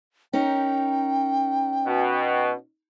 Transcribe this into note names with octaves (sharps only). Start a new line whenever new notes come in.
C#4 D#4 A#4 G5
B2